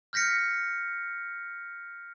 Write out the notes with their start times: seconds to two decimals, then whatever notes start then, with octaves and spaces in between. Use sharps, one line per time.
0.13 F6 G6 A#6 B6 C#7